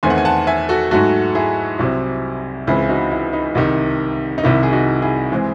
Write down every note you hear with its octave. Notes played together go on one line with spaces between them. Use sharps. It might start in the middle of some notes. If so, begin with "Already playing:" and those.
E2 D#3 A3 C4 G#5 C6
F#5
G#5
F#5 A5
E5 G#5
F#4 A4
G#2 F#3 A3 F#4 A4
E4 G#4
C2 C3 F#3 C4
C#2 C#3 E3 C4 E4 G#4
D#4 F#4
E4
D#4
C2 C3 D#3
D#4
C2 C3 D#3 E4
G#4
D#4 F#4
E4 G#4
E3 G#3 C4